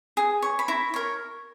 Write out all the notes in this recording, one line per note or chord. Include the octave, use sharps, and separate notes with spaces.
G#4
C#5
B5
E4 A#5
A#4 C#5